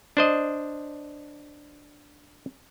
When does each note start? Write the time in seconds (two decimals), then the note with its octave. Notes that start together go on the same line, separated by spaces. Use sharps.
0.17 D4 C5 D#5